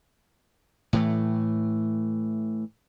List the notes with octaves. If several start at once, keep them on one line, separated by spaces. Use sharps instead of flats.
A2 E3 A3